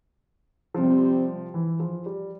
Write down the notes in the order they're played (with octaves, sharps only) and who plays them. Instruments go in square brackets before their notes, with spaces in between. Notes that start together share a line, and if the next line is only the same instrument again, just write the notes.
[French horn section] C3 G3 C4 [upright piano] F3
[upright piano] E3
F3
G3